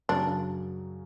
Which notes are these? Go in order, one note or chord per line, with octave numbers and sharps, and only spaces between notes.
F#2 C#3 F#3 D4